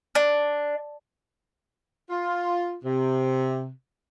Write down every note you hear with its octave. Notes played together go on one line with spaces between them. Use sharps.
D4
F4
C3